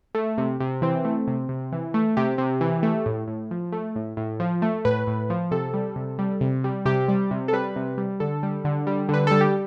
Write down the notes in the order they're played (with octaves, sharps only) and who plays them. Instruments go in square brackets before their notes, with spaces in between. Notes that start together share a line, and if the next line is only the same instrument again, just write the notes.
[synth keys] A3
C3
C3
E3 C4
A3
C3
C3
E3
A3
C3 G4
C3
E3
A3
A2
A2
F3
A3
A2
A2
F3
A3
A2 B4
A2
F3
C3 A4
G3
C3
G3
C3
G3
C3 G4
G3
C3
A4
G3 B4
C3
G3
D3 A4
G3
D3
G3
D3 B4
G3 A4
G4